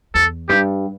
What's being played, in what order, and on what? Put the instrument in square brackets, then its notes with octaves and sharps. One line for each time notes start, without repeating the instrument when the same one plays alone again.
[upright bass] E2 [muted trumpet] A4
[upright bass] G2 [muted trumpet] G4